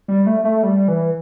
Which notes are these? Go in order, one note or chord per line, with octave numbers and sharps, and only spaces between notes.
G3
A3
A3
G3
E3